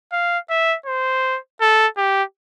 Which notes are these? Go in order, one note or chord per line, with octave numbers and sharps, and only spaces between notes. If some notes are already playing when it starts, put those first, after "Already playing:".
F5
E5
C5
A4
G4